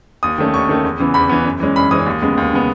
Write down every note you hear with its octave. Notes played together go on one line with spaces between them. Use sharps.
D#2 D#6
D#3 A3 C#4
D#2 C#6
D#3 A3 C#4
E2
C#3 E3 B3
E2 B5
C#3 E3 B3
F#2
E3 G#3 C#4
F#2 B5
E3 G#3 C#4 D#6
D#2
C#3 G#3 B3
D#2
C#3 G#3 B3